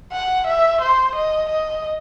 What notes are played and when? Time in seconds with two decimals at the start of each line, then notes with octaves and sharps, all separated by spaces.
0.12 F#5
0.47 E5
0.81 C5
1.15 D#5
1.50 D#5